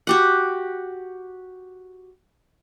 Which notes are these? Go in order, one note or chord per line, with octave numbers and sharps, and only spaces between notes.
F#4 G4 F#5